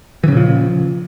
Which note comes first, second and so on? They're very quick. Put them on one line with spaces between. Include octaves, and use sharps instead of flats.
E3 C#3 A#2 F3